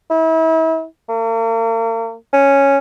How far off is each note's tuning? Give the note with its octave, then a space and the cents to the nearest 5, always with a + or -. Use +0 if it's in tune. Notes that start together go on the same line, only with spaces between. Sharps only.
E4 -35
A#3 -40
C#4 +0